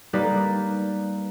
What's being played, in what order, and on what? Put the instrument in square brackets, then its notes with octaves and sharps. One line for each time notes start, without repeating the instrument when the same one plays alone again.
[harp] G3 A#3 D#4 G4 B4 D5